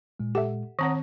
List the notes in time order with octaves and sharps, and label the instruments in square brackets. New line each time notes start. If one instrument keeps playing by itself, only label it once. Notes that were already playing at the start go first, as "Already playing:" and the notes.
[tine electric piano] A#2 G#3
[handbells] G4 A4 E5 [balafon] F#5
[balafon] D#3 C4 C#5 [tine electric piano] F#5 A#5 D#6